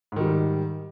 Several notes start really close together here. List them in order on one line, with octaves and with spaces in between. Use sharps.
G#2 D#3 G3